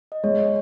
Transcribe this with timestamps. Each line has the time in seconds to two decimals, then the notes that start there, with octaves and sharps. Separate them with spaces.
0.12 D#5
0.24 G#3 C#5